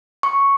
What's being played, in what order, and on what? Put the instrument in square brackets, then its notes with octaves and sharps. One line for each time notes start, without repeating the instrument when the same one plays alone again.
[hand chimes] C#6